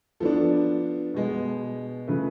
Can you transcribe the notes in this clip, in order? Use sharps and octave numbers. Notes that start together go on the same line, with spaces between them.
F3 B3 D4 A4
B2 G#3 B3
C#3 F3 A3 B4